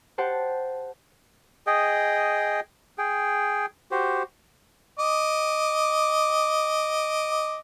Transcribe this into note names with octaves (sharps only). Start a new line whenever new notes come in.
G4 C5 F#5 A5
G#4 D#5 G5
G#4 G5
F#4 G4 C5
D#5 D6